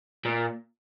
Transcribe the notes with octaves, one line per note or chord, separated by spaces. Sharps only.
A#2